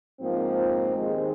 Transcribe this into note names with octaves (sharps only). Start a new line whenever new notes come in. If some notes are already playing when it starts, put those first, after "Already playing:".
G#2 F3 A#3 C4
D#2 D#3 G#3